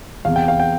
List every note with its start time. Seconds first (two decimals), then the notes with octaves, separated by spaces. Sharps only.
0.25 E2 C3 E3 B3 F5
0.36 G5
0.48 F5
0.60 G5